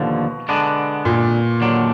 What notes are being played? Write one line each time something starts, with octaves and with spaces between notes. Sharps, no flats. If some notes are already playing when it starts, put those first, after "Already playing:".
Already playing: D#2 B2 D3 F3
D3 G#3 B3 D4
A#2
D#2 D3 F#3 D4